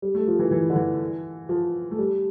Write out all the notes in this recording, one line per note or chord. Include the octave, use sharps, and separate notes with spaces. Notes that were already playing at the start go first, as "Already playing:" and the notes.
G3
A3
F3
E3
E3
D3
E3
F3
A3
G3